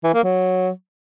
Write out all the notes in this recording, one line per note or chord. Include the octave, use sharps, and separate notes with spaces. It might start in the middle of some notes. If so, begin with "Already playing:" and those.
E3
A#3
F#3